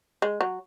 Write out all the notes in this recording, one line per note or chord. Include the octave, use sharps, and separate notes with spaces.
G#3
F#3